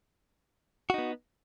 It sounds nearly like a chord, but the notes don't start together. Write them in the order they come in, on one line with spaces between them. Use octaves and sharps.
F#4 D#4 B3